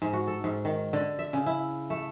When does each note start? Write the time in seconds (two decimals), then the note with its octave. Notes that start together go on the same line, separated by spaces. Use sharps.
0.02 G#2
0.13 F#4
0.27 A4
0.44 G#2
0.65 D#3
0.93 D3
1.19 E5
1.33 C#3
1.46 E4
1.90 A3